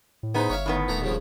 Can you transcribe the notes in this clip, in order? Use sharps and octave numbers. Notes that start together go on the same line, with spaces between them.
A2
B3 D#4 G#4 B4 C5
G1 C#5 E5 F5
A2 D#3 B3
D#1 E3 A3 A#5
G2 C#3 F3